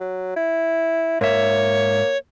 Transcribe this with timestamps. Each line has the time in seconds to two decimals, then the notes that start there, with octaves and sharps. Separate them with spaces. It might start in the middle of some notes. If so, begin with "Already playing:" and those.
0.01 F#3
0.36 E4
1.21 G#2 A#3 C#5 E5